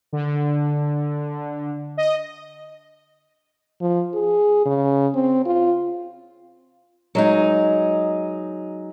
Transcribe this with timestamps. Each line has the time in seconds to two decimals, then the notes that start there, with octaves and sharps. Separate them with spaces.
0.13 D3
1.97 D#5
3.81 F3
4.14 G#4
4.66 C#3
5.15 C4
5.46 F4
7.15 F#3 G#3 D#4